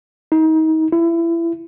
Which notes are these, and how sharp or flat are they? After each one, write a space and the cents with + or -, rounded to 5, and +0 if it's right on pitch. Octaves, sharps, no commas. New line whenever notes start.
D#4 +30
E4 +25